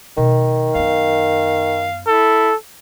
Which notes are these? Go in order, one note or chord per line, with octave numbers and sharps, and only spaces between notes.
B2 D#3
F#2 B3 F5
E4 A4